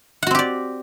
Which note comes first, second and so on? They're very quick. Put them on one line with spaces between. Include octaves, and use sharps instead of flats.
F#5 F#4 C4 G4 D5